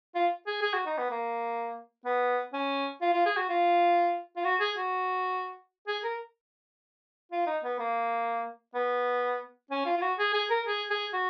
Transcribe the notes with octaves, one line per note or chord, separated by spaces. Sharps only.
F4
G#4
G#4
F#4
D#4
B3
A#3
B3
C#4
F4
F4
G#4
F#4
F4
F4
F#4
G#4
F#4
G#4
A#4
F4
D#4
B3
A#3
B3
C#4
F4
F4
F#4
G#4
G#4
A#4
G#4
G#4
F#4